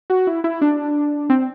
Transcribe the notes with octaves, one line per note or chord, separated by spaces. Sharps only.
F#4
E4
E4
D4
C4